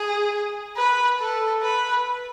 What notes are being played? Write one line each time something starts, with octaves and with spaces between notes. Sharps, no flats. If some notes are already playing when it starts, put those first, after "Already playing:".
Already playing: G#4
B4
A4
B4